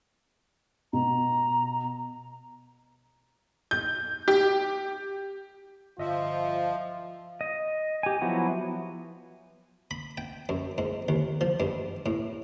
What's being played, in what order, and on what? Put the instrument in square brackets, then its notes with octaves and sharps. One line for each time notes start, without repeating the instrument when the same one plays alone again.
[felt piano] B2 [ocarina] A#5
[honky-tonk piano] G6
G4
[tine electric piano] G1 D#5 E5 [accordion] F3 [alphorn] F4
[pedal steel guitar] D#5
G4 G#5
F3 F#3 B3 E4 F#4
[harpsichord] B5
G5
F#2
G#2
D#2
F3
G2
A2